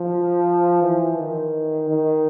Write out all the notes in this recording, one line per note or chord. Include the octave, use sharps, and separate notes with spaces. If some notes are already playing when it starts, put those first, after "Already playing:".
Already playing: F3
E3
D#3
D#3